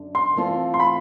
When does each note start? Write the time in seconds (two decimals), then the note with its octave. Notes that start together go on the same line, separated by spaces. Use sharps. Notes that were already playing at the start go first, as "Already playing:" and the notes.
Already playing: F#2 D3
0.15 C6
0.36 E3 A3 C4 F4 A4
0.74 C6
0.80 B5